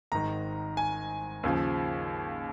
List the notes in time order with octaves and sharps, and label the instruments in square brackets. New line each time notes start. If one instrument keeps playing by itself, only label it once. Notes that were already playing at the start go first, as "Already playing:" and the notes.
[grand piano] G#1 G#2 D#3 A#5
G#5
D#2 C#3 F3